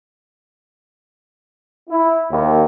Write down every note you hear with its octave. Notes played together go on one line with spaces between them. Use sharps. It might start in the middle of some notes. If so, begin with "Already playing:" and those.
E4
D#2